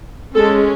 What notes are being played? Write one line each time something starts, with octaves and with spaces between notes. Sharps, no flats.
G#3 C#4 A4